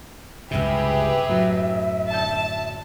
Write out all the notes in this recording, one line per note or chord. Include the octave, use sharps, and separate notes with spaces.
C#2 G2 C3 G4 G#4 B4 E5
F#2 A2 F#3
D3 A4 A5 G6